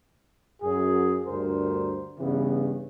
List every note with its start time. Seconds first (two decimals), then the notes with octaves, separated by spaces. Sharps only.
0.62 F#2 G#4
1.26 D2 G2 A#4 C5
2.19 G2 C#3 E3 B3